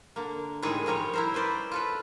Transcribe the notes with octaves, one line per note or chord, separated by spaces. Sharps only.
D3 A#3
A2 D#3 G3 G#3 G#4
F3 G3 A#4 C#5
E4 A#4 C5
C#4 B4 C5 D5
F4 A4 B4